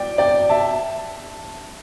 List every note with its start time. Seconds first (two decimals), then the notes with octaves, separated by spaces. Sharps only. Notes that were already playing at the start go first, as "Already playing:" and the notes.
Already playing: D5 G5
0.18 D5 G5
0.49 E5 A5